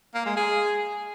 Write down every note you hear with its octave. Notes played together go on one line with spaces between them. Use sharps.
A#3
G#3
G#4